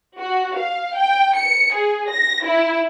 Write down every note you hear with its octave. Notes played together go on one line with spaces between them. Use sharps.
F#4
F5
G5
C#7
G#4
A#6
E4